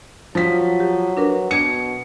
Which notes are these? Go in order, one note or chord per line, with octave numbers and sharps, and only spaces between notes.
F3 F#3 B6
G4
D4 A#4 B4
B2 D4 G#6 C#7